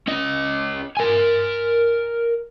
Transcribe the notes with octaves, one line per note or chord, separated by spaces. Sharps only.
C#4 D#5
A#4 G#5